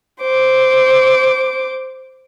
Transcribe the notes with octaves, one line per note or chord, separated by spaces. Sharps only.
C5 D6